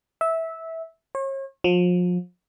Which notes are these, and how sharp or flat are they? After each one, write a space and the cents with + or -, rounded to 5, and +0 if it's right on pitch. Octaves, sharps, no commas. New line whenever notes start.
E5 -15
C#5 -40
F3 +35